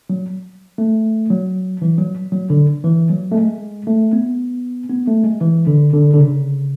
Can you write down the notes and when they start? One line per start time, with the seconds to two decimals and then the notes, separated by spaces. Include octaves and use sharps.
0.10 F#3
0.78 A3
1.30 F#3
1.82 E3
1.98 F#3
2.32 F#3
2.50 D3
2.84 E3
3.10 F#3
3.32 A3
3.35 G#3
3.87 A3
4.13 B3
4.89 B3
5.08 A3
5.24 G#3
5.41 E3
5.67 D3
5.93 D3
6.14 D3
6.18 C#3